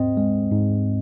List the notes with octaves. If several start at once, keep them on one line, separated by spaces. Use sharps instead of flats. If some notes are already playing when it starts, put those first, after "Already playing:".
Already playing: G#2 C4 D#5
G#3
G#2